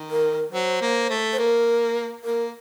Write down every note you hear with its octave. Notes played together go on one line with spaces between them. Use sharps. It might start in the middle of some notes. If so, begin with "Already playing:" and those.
Already playing: D#3
A#4
F#3 C5
A#3
A3
C5
A#3 A#4
A#3 A#4